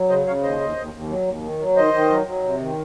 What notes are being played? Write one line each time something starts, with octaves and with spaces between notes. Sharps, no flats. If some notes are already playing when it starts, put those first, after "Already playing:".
Already playing: F#3
C#3 C5 D#5
C#3 C#5 F5
D#2 C5 D#5
D#2
D#2
D#2
F#3
D#2
D#3
F#3
D#3 C5 D#5
D#3
F#3
F#3
C3
D#3